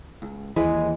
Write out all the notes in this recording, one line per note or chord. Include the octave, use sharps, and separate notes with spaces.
C#2
D#2 E3 G#3 E4 G#4 B4